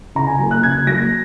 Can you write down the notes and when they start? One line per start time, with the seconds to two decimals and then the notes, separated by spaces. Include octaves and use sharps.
0.15 C#3 A#5
0.27 G#5
0.39 F#3 A#3
0.51 F#6
0.63 C#3 G#6
0.87 F#3 A#3 A#6